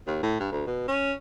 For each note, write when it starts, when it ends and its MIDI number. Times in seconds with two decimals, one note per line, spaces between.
0.07 0.22 39
0.22 0.35 45
0.40 0.49 43
0.52 0.65 38
0.67 0.84 47
0.88 1.13 61